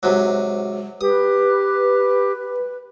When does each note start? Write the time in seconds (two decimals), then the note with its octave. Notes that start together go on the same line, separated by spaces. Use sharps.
0.03 G#2 C3 F#3
1.01 G4 B4 D#6